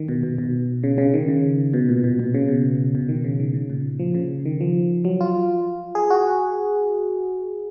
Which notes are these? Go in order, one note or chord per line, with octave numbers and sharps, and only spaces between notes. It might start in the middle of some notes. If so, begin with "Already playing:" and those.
Already playing: D#3
B2
B2
B2
C#3
C#3
D#3
C#3
B2
A#2
B2
B2
C#3
B2
B2
D#3
C#3
D#3
C#3
A#2
F3
C#3
D#3
F3
F#3
F4
G#4
F#4